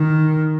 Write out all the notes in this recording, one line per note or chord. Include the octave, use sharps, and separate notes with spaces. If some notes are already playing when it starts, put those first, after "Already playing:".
Already playing: D#3